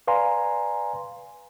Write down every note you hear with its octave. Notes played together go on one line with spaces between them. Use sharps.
B4 D5 F5 G#5 A#5 C6